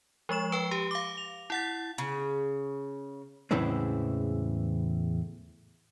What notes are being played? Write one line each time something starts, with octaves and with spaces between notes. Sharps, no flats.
F3 G#3 C#6 E7
B4 G5
G4
F5 D6
F7
E4 F#5 A6
C#3
E2 A2 C#3 E3 G#3 C4